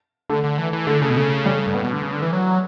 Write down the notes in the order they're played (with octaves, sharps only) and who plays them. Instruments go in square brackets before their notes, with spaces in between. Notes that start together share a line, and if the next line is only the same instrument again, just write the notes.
[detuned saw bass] D3 [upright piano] A3
[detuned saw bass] D3
E3
E3
[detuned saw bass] D3 [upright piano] A3
[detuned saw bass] C#3 [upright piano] A3
[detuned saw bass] B2
[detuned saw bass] C#3 [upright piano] A3
[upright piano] G3
A3
[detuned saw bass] G2 [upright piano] A3
[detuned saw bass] A2 [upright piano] B3
[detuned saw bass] B2
D3
C#3
D3
E3
F#3